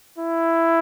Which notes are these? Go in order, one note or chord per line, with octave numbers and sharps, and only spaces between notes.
E4